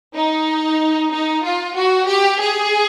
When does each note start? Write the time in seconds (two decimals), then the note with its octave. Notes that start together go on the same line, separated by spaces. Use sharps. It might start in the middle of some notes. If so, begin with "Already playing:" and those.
0.14 D#4
1.11 D#4
1.44 F4
1.76 F#4
2.08 G4
2.41 G#4